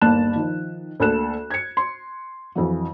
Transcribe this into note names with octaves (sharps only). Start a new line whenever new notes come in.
G1 D#2 A#3 A5 F#6 E7
D#3 F3
D2 A#3 A4 F#6 E7
G#6 C#7
C6
F2 E3 F#3